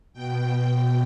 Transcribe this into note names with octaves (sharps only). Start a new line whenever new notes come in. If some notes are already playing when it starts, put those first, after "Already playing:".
B2 G5